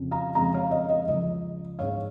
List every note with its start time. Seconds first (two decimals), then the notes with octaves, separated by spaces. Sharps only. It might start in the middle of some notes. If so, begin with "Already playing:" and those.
Already playing: F2 C#3 F3
0.11 F5 A#5
0.35 F2 C#3 G#3 F5 A#5
0.54 C#5 F5
0.71 D#5
0.89 D#5
1.07 C#2 C#3 F3 D#5
1.79 G#2 G#3 C#5 F5